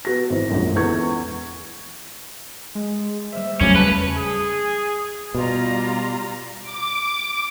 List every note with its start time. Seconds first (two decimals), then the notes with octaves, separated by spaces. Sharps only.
0.05 B3 F#4 A#6
0.30 G#1 E3 C5
0.50 A#1 F#2 A#2 G#3
0.76 E2 E4 A4 B4 C#6 G#6
2.75 G#3
3.32 G3 A#3 C5 E5
3.61 E2 C#3 F#3 A3 C#4 D6
3.76 B4 G5 A5
4.17 G#4
5.35 B2 G3 F4 A#5
6.62 D6